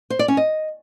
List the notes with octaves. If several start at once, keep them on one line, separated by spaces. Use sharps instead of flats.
C5
D5
C#4
D#5